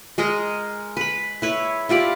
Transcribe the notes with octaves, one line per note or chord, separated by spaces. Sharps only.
G#3 G#4 A#4 D#5
B4 B5
E4 B4 C#5
E4 F4 G4 D5